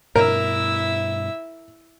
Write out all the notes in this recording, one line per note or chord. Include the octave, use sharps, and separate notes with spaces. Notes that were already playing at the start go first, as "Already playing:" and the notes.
G2 B2 E4 A#4 E5